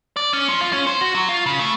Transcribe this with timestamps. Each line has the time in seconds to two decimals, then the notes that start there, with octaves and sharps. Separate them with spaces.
0.17 D5
0.33 C#4
0.49 F3
0.61 F4
0.73 C#4
0.87 C5
1.01 F#4
1.14 F#3
1.29 F4
1.46 C#3
1.59 A3